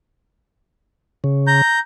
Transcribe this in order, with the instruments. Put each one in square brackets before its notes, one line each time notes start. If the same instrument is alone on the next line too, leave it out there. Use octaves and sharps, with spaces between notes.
[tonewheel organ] C#3
[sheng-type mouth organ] A#5 G6